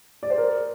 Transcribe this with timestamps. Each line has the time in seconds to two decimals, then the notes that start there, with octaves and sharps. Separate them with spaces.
0.23 D5
0.30 C5
0.38 A#4